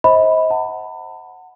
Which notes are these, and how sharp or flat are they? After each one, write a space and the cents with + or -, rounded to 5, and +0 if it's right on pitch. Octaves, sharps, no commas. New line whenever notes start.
C5 +20 D#5 +40 B5 +0
F#5 +0 A5 +40